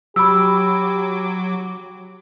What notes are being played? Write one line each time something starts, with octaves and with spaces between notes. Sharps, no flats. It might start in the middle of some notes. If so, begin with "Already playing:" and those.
F#3 G4 B5 D6 E6